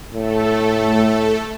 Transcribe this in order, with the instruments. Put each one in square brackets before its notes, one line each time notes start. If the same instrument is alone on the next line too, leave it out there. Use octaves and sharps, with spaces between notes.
[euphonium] A2 [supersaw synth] A3 A4